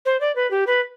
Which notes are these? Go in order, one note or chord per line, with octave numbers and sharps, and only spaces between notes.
C5
D5
B4
G4
B4